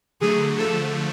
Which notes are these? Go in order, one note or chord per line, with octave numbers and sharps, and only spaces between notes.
D3 F#3 A3 G#4
D3 F3 A3 A4